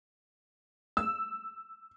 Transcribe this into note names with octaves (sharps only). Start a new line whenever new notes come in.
E6